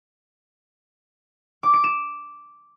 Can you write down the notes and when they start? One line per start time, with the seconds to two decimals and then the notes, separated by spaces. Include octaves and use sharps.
1.63 D6
1.73 D7
1.84 E7